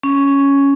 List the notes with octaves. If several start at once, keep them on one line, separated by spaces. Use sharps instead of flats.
C#4